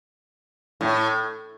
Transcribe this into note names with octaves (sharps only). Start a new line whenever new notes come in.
A2